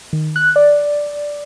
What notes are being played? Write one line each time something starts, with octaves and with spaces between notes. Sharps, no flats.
D#3
F#6
D5